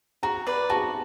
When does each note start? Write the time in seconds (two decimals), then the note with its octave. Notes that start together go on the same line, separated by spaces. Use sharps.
0.23 F#4 A#5
0.46 B4 D5
0.70 F#4 A5